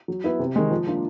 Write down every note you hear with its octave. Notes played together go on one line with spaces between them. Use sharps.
F#3
B3 E4
C3
D#3 G#3
F3
A#3 D4 F4